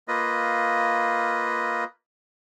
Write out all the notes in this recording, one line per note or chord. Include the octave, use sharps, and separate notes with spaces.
A#3 F4 B4 D#5